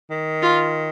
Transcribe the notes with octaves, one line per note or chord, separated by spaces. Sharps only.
D#3
F4